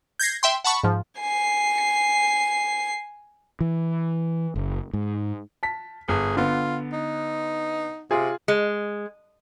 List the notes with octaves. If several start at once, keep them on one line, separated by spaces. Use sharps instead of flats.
G6 G#6 A#6 C7
E5 G5 C6
F#5 A5 B5 C#6
G#2 F3
G#5 C7
E3
F#1
G#2
A5 B6
G1 G#4
D3 B3 F4
D#4
C3 F4 G#4
G#3